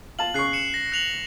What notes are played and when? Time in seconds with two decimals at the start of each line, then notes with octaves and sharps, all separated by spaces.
0.19 F4 A5 F#7
0.34 C#3 C#6 F#6 C7
0.53 C#7 E7
0.74 A#6
0.92 F#6 F7 F#7